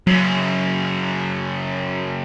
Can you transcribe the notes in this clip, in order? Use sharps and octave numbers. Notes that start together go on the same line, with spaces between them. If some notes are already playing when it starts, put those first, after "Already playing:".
F#2 C#3 F#3